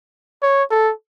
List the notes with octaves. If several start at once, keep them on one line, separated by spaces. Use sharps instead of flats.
C#5
A4